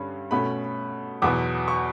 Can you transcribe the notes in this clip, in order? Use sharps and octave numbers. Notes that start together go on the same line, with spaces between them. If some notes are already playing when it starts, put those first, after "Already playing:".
Already playing: G2 D3 G3 C#4 B5
B2 A3 C#4 B5
E2 B2 F#3 B3 D6
C#6